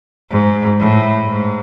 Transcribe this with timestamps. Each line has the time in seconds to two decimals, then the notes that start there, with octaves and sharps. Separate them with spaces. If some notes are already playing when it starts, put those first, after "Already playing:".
0.30 G#2
0.79 A2
1.27 G#2